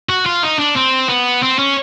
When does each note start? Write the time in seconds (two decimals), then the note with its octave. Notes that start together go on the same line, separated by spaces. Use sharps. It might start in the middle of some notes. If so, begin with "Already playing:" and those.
0.09 F#4
0.26 F4
0.43 D#4
0.59 D4
0.76 C4
1.09 B3
1.43 C4
1.59 C#4